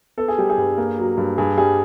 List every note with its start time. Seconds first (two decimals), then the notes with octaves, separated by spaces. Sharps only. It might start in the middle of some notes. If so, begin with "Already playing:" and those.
0.18 B3 A4
0.28 G#4
0.38 G3 G4
0.50 G#4
0.58 G2
0.77 A#3
0.98 F#3
1.17 G2
1.38 G2 G#4
1.58 G3 G#4